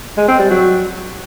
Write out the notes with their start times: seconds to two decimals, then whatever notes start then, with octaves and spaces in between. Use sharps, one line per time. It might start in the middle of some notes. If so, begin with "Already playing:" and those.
0.17 G#3
0.28 C4
0.39 G3
0.50 F#3